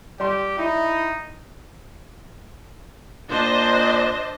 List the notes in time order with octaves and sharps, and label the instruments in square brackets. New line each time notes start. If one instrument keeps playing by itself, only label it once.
[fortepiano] G3 C6 [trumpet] G4
[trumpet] D#4 [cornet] E4
[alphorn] A#2 [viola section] D4 C5 D#5